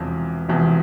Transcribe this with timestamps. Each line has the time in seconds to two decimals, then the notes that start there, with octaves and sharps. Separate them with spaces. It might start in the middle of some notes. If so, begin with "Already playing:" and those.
Already playing: E1 E2 C3 F3
0.48 E1 E2 C3 F3